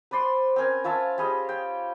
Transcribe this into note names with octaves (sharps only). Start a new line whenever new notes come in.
B4 C5 D5 C6
C4 C#4 A#4 G#5
F4 C#5 E5 A5
G3 G#4 D#5
G5